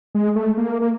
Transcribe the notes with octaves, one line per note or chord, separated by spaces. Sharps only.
G#3
A3
A#3
A#3